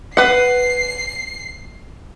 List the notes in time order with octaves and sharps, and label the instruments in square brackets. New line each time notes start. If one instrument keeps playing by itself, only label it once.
[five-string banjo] B4 F#5 [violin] C7